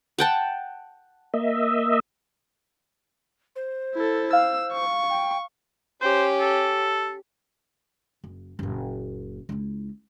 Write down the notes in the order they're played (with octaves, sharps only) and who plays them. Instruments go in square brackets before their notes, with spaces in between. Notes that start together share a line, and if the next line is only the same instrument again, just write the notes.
[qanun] F#5 G5 A5
[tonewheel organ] A#3 D#5 E5
[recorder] C5
[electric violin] E4 A4
[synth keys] F5 [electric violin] E6
[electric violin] C#6
[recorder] G5
[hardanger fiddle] C#4 G4 [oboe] C5
[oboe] A4
[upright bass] F#1
F#1 A#2
C#2 E4